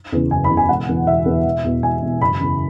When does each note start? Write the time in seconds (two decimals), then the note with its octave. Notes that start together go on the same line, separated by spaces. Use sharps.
0.12 E2 C#3
0.31 F#1 G#5
0.44 B5
0.50 E2 C#3
0.57 G#5
0.69 E1 F#5
0.88 E2 E3 B3
1.07 E1 E5
1.26 E2 E3 B3
1.45 E1
1.64 E2 B2
1.82 E1 G#5
2.02 E2 B2
2.21 F#1 B5
2.40 E2 C#3